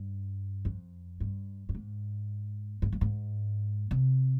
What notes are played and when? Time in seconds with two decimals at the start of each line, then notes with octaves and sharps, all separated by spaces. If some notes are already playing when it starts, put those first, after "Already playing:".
Already playing: G2
0.65 F2
1.20 G2
1.69 G2
1.75 G#2
2.82 G#2
2.93 G2
3.01 G#2
3.91 C3